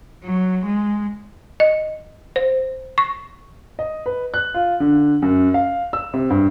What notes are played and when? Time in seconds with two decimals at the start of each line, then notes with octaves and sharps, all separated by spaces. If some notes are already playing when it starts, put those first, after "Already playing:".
0.24 F#3
0.66 G#3
1.60 D#5
2.36 C5
2.98 C#6
3.79 D#5
4.06 B4
4.34 F#6
4.54 F4
4.80 D3
5.22 F#2
5.54 F5
5.93 E6
6.14 C3
6.30 G2